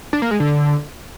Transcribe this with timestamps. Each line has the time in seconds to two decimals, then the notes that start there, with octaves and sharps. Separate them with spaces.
0.13 D4
0.22 A#3
0.31 G#3
0.40 D3